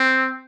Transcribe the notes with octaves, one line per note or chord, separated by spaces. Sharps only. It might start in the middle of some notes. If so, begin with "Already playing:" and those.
Already playing: C4